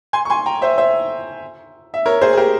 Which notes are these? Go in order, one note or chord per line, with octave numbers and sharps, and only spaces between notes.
G#5 C6
C#6
G#5 C6
G5 A#5
C5 E5
C5 E5
E5
A#4 C#5
G#4 C5
G#4
G4 A#4